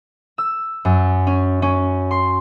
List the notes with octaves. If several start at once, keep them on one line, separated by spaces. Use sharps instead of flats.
E6
F#2
C#4
C#4
C6